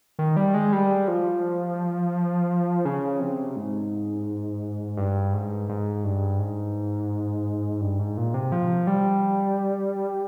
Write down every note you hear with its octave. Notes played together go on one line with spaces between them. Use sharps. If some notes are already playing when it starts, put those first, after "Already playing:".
D#3
G3
G#3
G3
F3
C#3
C3
G#2
G2
G#2
G#2
G2
G#2
G2
G#2
A#2
C3
F3
G3